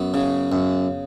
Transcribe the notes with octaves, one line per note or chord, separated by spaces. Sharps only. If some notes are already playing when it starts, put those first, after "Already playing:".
Already playing: F#2 B3
C#3
F#2